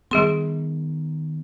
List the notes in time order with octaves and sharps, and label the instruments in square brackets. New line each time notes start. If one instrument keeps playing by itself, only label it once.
[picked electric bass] D#3 B3 [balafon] G3 G#4 C6